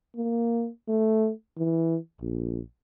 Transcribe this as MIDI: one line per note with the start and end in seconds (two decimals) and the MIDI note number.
0.16 0.69 58
0.89 1.31 57
1.58 1.97 52
2.21 2.61 34